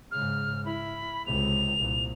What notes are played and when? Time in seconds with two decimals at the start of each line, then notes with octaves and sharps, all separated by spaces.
0.12 G#2 C#3 F6
0.65 E4 B5
1.26 C#2 C3 F7
1.79 C2 A#2